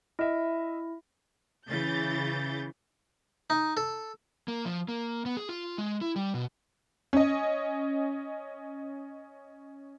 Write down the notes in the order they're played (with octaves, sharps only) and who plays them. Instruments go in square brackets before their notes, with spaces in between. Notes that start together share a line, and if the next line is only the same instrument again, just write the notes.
[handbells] E4 [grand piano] D#5 E5
[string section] C#3 E3 G6 A6
[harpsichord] D#4
A4
[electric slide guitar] A#3
F3
A#3
B3
G#4
F4
G#3
E4
G3
B2
[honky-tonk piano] C#4 D#5